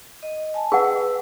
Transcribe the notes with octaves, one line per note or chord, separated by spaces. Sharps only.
D#5
G#5 A5
G#4 B4 F#5 E6